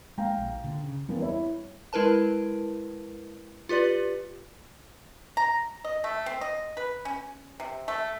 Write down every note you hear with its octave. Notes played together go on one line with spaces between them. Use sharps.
G#3 A#3 F5 G5 A#5
A#1
A#2 D3
C#3
E2 G3 A#3 C4
E4 C#5 E5
G#3 E4 A#4 B4 A5
F4 G4 B4 D5
A#5
D#5
A3
C4
D#5
B4
C#4
C3
A3